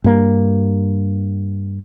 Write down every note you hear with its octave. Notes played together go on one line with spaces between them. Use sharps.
G2 A#3